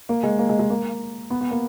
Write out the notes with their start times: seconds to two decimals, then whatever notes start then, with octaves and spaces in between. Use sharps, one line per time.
0.09 A#3
0.23 G#3
0.39 A#3
0.49 G#3
0.59 G#3
0.70 A#3
1.30 B3
1.41 B3
1.51 A#3